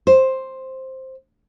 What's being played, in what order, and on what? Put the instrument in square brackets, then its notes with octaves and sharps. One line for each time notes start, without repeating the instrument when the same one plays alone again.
[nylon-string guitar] C5